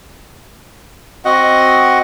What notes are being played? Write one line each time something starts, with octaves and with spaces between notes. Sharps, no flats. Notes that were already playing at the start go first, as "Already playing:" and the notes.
C4 F#4 D#5 F#5